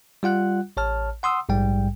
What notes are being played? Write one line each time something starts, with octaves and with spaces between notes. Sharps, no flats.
G3 F4 F#5 F#6
A1 C#5 A5 F6
F#5 C6 D#6 E6
A#1 G#2 G3 G5